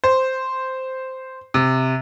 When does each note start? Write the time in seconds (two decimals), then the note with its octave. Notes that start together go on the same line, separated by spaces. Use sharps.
0.04 C5
1.54 C3